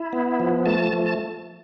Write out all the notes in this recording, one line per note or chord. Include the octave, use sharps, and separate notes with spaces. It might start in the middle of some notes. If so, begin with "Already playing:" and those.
Already playing: E4
B3
F3
A3 A5
F3
A5